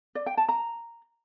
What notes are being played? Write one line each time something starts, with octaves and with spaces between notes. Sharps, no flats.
D5
G5
A5
A#5